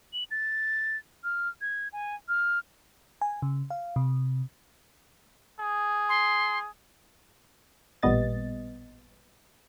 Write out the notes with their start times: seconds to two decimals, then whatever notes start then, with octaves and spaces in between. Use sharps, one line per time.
0.13 F#7
0.31 A6
1.24 F6
1.61 G#6
1.93 G#5
2.29 F6
3.21 G#5
3.42 C#3
3.70 F5
3.96 C3
5.60 G#4
6.09 C6
8.03 A1 A#2 G3 B3 D#5 A6